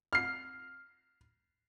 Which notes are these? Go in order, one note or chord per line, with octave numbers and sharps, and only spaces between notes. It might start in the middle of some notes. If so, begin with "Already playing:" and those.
F6 C7